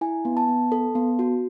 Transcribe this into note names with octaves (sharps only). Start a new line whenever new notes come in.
E4 G#5
B3
A5
B3
A4
B3
F#4